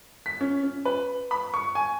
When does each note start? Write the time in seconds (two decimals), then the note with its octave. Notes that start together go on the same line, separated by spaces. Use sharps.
0.26 B6
0.41 C#4
0.63 C#4
0.85 B4
1.31 B5
1.54 C#6
1.75 G#5